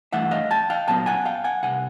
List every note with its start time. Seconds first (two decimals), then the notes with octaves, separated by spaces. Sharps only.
0.13 G2 E3 A3 E5 F#5
0.31 D#5 F5
0.51 G5 A5
0.70 F5 G5
0.88 A#2 F#3 B3 G5 A5
1.06 F#5 G#5
1.25 F5 G5
1.44 F#5 G#5
1.63 C2 C3 F#5 G#5